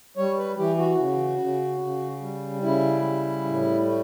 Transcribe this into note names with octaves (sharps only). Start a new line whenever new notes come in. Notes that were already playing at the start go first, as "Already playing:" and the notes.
G3 C#5
B4
E3 G4
F#4
C#3
C#3
C#3
G3
C#3 E4
G3
A2
A3